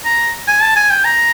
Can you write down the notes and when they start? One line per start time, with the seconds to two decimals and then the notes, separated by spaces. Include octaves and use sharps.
0.05 A#5
0.48 G#5
0.62 A5
0.76 G#5
0.90 G5
1.05 A#5